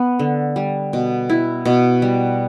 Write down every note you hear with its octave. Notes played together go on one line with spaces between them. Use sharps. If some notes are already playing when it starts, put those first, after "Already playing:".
Already playing: B3
D3
G3
B2
E4
B2
G3